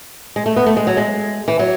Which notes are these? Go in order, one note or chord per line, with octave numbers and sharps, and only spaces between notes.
G#3
A3
B3
A3
G#3
F#3
G#3
E3
F#3